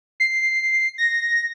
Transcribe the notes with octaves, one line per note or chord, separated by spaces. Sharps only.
C7
A#6